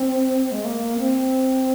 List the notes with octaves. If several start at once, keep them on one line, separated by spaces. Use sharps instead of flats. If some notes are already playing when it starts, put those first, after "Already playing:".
Already playing: C4
G#3
A#3
C4